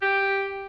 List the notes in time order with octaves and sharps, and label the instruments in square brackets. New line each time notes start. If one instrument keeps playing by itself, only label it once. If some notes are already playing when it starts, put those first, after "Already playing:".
[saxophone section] G4